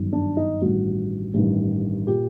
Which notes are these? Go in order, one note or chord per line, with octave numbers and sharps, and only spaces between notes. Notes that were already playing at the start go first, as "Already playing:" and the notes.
Already playing: G1 F#2 D#3
D4
D#4
A1 G2 D#3 F#4
A1 G2 D#3
A#2 G4